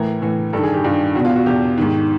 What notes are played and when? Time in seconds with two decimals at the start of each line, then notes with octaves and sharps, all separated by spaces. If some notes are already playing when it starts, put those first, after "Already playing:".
Already playing: A2 E3 A#4
0.22 A2 E3
0.53 G2 D#3 A4
0.63 G#4
0.74 G4
0.84 G2 D#3 F4
1.15 E2 B2 F#4
1.25 F4
1.36 F#4
1.46 E2 B2 G4
1.78 G#2 D#3